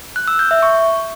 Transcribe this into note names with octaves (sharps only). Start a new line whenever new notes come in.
F#6
E6
G6
E5
C#6